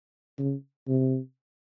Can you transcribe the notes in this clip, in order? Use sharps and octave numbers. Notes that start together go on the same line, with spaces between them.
C#3
C3